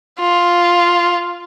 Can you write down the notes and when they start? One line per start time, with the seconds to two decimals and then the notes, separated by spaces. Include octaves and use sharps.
0.20 F4